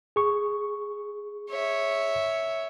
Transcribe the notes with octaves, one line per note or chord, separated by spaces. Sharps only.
G#4 C#6
C#5 E5